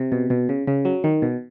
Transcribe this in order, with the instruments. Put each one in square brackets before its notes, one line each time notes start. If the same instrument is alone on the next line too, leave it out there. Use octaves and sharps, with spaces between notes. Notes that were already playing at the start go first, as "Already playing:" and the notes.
Already playing: [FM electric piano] C3
B2
B2
C#3
C#3
F#3
D#3
B2